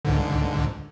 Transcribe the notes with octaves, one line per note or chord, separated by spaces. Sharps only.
C#2 G#2 D3